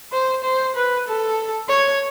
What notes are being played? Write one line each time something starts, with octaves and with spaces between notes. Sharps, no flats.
C5
C5
B4
A4
C#5